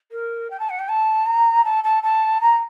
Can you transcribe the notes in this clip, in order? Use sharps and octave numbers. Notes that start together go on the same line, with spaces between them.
A#4
G5
A5
F#5
G5
A5
A#5
A5
A5
A5
A#5